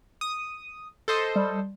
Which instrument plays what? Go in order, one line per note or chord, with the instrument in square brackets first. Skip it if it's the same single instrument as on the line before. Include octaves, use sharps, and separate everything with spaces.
[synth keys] D#6
A4 C5 D#5
[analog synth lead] G3